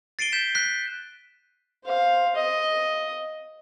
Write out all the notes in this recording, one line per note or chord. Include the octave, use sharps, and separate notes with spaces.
A6 C7 D7 D#7 G7
G6 B6 E7
F#6 B6
C5 F5
D#5